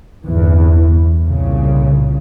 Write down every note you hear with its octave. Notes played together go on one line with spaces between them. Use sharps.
G1 E2 E3
C2 A#2 C#3